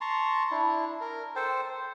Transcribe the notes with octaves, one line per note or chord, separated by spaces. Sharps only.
A5 A#5 C6 C#6
D4 E4
A#4
A4 C5 G5 A5
C5